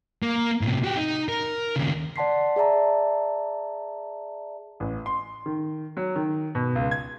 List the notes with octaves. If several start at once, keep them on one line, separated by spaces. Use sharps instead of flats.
A#3
A2 C3
F#4 G4
D#4
A#4
D#2 C#3
D5 F#5 A5 C6 B6 C7
G#4 D5 E5 A5 A#5
A1
C6
D#3
F#3
D#3
B2
C#2
G#6